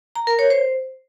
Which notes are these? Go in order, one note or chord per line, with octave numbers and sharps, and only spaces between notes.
A#5
A#4
C#5
C5